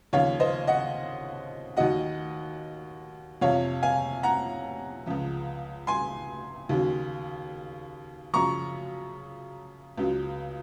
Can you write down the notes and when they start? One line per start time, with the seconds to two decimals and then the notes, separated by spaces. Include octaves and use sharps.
0.13 D#2 C#3 F3 C#5 F5
0.40 C5 D#5
0.67 D#5 F#5
1.77 D#2 D#3 F#3 D#5 F#5
3.41 F2 C3 F3 C#5 F5
3.83 F5 G#5
4.23 F#5 A#5
5.06 C#2 C#3 F3
5.87 G#5 C6
6.69 D#2 C#3 F#3
8.33 F#2 C#3 F3 A#5 C#6
9.98 C#2 C#3 F#3